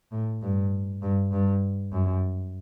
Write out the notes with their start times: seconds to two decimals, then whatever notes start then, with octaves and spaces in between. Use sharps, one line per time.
0.12 A2
0.42 G2
1.02 G2
1.31 G2
1.92 F#2